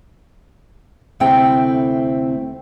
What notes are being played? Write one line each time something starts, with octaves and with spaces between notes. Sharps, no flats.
D2 C3 A3 C4 E4 G5